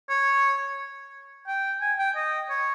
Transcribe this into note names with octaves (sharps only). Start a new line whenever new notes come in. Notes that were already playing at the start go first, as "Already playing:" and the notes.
C#5
G5
G#5
G5
D#5
C#5